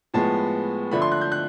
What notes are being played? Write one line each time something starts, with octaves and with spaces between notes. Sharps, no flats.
A2 F3 G#3 B3 A5
D3 F3 A3 B5
C6
F#6
G6
F#6